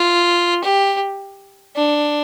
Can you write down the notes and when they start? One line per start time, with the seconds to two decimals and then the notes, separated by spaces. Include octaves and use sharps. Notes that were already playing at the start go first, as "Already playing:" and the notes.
Already playing: F4
0.64 G4
1.76 D4